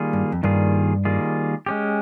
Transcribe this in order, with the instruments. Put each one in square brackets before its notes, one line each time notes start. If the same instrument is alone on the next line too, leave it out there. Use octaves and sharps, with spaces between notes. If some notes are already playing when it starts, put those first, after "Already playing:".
Already playing: [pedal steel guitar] D#3 G3 A#3 F4 G#4
[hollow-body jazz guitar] G2
F2
[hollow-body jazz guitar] G2 [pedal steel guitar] D#3 G3 A#3 F4 G#4
[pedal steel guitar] D#3 G3 A#3 F4 G#4
G#3 C#4 G4